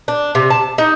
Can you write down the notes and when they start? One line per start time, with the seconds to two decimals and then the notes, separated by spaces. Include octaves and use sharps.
0.08 D4
0.35 C3
0.50 A5
0.78 D#4